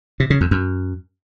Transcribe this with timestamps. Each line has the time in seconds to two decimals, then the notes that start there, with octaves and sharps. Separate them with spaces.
0.20 C3
0.30 C#3
0.41 F2
0.51 F#2